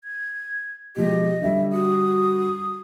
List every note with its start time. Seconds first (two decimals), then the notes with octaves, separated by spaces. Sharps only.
0.04 G#6
0.96 B2 F3 G#3 G4 D#5
1.42 D3 G3 E5
1.72 F#4 D#6